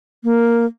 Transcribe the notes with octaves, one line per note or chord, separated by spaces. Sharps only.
A#3